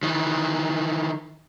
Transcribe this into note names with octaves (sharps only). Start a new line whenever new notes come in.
D#3 E3